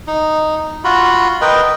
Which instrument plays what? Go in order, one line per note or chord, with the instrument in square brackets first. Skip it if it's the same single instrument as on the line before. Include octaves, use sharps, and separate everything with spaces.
[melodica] D#4
F4 F#4 B5
A#4 B4 D#5 G5